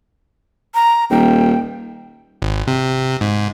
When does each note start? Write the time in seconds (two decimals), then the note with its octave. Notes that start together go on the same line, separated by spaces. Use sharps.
0.74 A#5
1.10 D#1 G5
2.42 G#1
2.67 C3
3.21 G#2